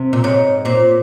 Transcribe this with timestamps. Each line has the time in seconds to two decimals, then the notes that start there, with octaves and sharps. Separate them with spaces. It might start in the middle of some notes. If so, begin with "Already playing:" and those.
Already playing: C3
0.13 A#2
0.24 G#2 C#5
0.65 A#2 C5